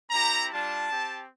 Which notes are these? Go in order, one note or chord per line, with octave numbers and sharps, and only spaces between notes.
C4 E4 G4 A#5
G3 D4 F4 A5
C4 G4